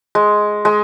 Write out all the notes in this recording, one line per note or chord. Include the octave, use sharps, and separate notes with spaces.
G#3
G#3